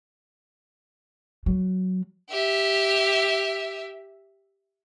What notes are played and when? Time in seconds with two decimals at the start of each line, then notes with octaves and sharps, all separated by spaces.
1.46 F#3
2.29 G4 E5